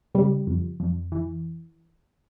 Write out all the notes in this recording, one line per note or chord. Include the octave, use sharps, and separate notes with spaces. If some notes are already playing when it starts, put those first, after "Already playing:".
C#3 G3
F2
F2
E3